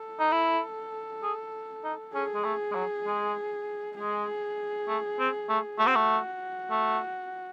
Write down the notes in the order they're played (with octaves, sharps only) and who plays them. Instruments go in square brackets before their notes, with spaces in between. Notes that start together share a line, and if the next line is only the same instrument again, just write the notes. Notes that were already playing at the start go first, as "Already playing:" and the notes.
Already playing: [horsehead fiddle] A4
[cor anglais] D#4
E4
G#4
D#4
[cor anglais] C#4 [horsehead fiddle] G#4
[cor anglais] G#3
A3
G#3
F#3
G#3
[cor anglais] G#3 [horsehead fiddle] G#4
[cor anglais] A3
C4
A3
[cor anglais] A3 [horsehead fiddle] F#4
[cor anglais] C4
A3
A3